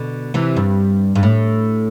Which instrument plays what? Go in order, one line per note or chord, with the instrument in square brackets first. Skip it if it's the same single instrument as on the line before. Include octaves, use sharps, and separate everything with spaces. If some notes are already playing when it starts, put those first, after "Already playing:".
Already playing: [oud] B2 D3
C3 E3
G2
G2
A2